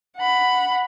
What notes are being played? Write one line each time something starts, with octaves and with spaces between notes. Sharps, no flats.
F#5 B5